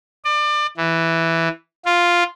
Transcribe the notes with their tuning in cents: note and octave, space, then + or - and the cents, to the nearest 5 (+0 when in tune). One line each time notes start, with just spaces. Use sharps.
D5 +30
E3 +0
F4 +0